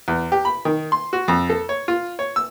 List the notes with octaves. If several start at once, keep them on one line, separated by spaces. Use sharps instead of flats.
E2
G4
B5
D#3
C6
F#4
F2
A4
C#5
F4
C#5
E6